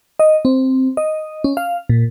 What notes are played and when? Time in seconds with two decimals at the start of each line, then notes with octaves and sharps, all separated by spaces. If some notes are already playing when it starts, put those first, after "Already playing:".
0.19 D#5
0.45 C4
0.97 D#5
1.44 C#4
1.57 F5
1.89 A#2